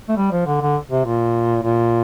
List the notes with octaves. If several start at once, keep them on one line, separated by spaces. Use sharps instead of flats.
A3
G3
F3
D3
D3
C3
A#2
A#2